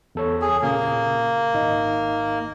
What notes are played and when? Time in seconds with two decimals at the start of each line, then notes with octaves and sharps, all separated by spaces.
0.15 E2 A4 C#5
0.42 G#4
0.62 A#2 C#3 A#3
1.54 G#1 D#4 D#5